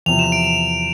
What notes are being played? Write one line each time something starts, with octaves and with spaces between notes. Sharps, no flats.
E2 C3 F3 F7
E7
D7
D7